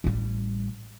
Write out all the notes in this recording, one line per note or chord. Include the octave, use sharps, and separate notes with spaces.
A1 G3